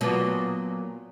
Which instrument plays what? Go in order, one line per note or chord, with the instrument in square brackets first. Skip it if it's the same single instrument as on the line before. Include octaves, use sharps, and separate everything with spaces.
[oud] A#2 F#3 B3